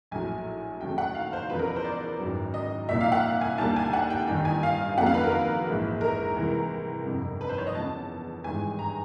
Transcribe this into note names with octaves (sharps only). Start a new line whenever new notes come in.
A#1 A2 F#3 G#5
D#2 C#3 F#3 A3 G5
F#5
F5
C5
E2 C#3 F3 B4
A#4
B4
C5
D5
G#1 F#2 C#3 F#3
D#5
C2 A#2 F3 A#3 E5
F5
F#5
G#5
D2 D3 G3 A#3 A5
G#5
F#5
G5
A1 G2 D#3 G5
G#5
F5
F2 C#3 F#3 A#3 F#5
F5
B4
A#4
B4
A#1 G#2 E3 G#3
A#4
C2 C3 E3 G#3
G1 F2 C3
B4
C5
C#5
D#5
E2 C#3 F3 A5
G#1 G2 E3 G#3 G#5
A#5